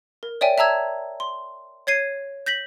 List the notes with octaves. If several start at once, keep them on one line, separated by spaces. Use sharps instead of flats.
A#4
C#5 D5 E5 G5 G#5
E5 A5 A#5 E6 G#6
C6
C#5 G#6 C7 D#7
G6 A#6 B6 F#7